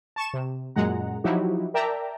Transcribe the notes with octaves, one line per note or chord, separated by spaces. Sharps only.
A5 C#6 E7
C3
F#2 A#2 G#3 F#5 A#5
F3 F#3 D#4 E4 F#4 G4
A#4 D5 E5 G5 A5 A#5